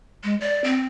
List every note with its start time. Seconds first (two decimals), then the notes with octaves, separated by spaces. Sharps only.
0.24 G#3
0.41 D5
0.64 C4